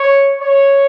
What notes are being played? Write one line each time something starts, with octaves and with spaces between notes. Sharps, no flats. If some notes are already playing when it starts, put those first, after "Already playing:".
Already playing: C#5
C#5